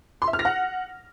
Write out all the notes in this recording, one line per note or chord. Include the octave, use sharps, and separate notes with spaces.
C6
E5
F6
A#6
F#5